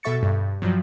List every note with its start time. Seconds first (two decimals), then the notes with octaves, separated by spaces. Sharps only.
0.03 B2 A4 E5 C#6 A6 C#7
0.23 G2
0.62 G2 F3 F#3